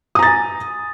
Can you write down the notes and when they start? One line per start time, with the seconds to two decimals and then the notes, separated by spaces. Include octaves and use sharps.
0.15 D#6
0.19 A#5
0.23 A6
0.26 G#5